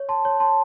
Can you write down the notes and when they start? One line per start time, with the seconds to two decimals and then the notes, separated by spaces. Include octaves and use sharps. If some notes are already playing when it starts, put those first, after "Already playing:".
Already playing: C#5
0.09 A5 C6
0.25 C#5
0.40 A5 C6